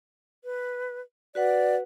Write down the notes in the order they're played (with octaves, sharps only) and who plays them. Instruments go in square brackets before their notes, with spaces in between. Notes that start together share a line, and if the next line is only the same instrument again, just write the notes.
[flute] B4
[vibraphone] F#4 B4 F#5 [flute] D5